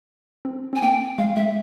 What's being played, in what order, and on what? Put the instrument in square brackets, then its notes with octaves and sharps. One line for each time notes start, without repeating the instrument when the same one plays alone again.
[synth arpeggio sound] C4
[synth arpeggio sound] C4 [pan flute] G#5
[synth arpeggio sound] A#3 [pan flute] G5
[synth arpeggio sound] G#3 [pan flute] F5
[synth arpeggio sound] G#3 [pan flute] E5